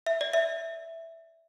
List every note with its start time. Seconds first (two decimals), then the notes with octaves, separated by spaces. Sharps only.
0.06 E5
0.21 D5
0.33 E5